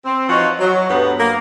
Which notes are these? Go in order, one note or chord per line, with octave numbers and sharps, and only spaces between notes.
C4
E3 F3 D#4 F4 F#4 C#5
F#3
D2 G2 F#3 B3
A#3